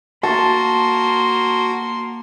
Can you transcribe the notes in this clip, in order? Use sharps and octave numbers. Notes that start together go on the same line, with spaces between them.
A#3 F#4 A5 C6